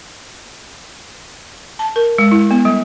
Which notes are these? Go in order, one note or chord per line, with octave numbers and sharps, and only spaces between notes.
A5
A#4
G#3
E4
B3
G3